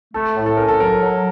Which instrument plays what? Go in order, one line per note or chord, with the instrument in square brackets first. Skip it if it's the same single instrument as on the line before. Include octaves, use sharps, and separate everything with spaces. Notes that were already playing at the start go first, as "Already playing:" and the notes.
[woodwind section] A3 [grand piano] A4
[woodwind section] A2
[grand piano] A4
[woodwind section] C#4 [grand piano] A#4
[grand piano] A4
[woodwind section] F#3 [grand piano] A#4
[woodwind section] F#3